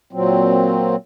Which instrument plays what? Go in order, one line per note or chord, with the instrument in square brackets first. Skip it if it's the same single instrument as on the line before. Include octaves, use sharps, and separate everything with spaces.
[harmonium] A#2 F#3 C4